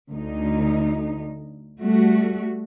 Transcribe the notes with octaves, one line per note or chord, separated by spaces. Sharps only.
D2 D#4
G3 A3 F#4